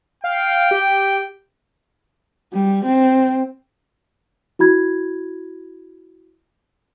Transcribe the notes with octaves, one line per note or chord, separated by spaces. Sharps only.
F5 G5
G4
G3
C4
E4 F#4 B5 G#6